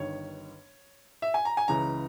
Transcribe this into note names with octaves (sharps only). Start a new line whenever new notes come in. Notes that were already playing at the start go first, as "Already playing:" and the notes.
Already playing: G1 G2 D#3 C#5
E5
G#5
A#5
G#5
C#2 C#3 E3 A#5